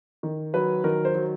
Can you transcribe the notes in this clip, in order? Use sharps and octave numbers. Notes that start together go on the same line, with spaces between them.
D#3
F#3 B4
D#3 A#4
C5
F#3